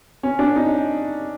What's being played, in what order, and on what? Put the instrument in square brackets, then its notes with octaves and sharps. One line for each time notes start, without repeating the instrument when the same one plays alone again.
[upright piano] C#4
D4
D#4